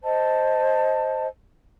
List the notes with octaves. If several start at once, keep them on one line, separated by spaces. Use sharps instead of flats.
C5 D#5 A5